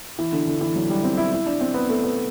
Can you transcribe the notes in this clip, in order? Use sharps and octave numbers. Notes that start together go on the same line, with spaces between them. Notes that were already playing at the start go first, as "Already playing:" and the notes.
E3
D3
D3
E3
F#3
G3
C4
E4
E4
D4
C4
B3
A3
B3